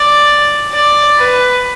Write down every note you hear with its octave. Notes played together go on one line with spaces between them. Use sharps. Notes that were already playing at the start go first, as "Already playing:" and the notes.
Already playing: D5
D5
B4